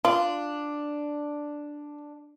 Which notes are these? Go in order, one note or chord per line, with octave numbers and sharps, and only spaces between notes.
D4 F4